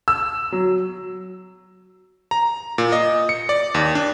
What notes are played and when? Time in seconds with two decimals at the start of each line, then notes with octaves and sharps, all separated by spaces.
0.08 E6
0.52 F#3
2.31 A#5
2.78 A#2
2.92 D#5
3.29 C#7
3.49 D5
3.75 D#2
3.95 D4